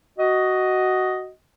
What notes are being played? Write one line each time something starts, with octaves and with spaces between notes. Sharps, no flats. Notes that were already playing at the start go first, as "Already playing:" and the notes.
F#4 D#5